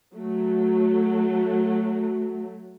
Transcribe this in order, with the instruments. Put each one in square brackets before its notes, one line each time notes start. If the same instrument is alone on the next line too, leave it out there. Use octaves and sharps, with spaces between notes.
[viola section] F#3 A3